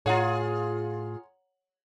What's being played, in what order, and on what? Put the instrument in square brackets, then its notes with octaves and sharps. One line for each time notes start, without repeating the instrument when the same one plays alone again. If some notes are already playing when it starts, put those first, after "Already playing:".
[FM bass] A2 [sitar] F4 G#4 [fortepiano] C#5 F#5 A#5